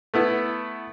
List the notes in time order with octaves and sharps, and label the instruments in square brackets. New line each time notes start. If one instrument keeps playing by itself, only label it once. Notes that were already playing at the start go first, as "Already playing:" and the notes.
[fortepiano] A3 B3 E4